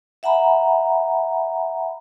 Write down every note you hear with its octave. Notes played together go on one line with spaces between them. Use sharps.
E5 F#5 G#5 A#5 B5